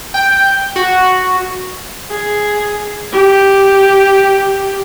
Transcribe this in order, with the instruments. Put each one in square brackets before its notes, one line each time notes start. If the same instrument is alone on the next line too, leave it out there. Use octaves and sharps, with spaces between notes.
[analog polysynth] G5
F#4
[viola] G#4
G4